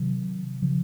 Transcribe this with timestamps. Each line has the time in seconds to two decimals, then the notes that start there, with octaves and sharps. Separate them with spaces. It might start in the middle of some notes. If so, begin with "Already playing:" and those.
Already playing: C3 D#3 F#3
0.62 C#3 F3